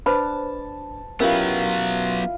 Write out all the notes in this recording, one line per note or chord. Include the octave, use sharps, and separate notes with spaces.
D4 B4 C5 A5 B5
F#3 B3 C#4 E4 F4 G4 A#4 B4